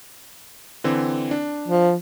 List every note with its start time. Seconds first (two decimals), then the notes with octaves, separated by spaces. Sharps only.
0.84 D3 E3 C4
1.31 D4
1.68 F3